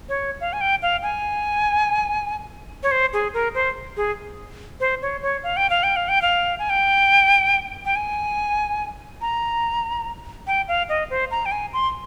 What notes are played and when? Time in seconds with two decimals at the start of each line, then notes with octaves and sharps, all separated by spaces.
0.09 C#5
0.41 F5
0.53 G#5
0.61 G5
0.82 F5
1.03 G#5
2.83 C#5
2.91 C5
3.13 G#4
3.34 A#4
3.55 C5
3.97 G#4
4.80 C5
5.02 C#5
5.23 C#5
5.44 F5
5.57 G5
5.70 F5
5.83 G5
5.96 F5
6.09 G5
6.22 F5
6.59 G#5
6.70 G5
7.85 G5
7.96 G#5
9.21 A#5
10.47 G5
10.68 F5
10.89 D#5
11.10 C5
11.31 A#5
11.46 G5
11.52 G#5
11.73 C6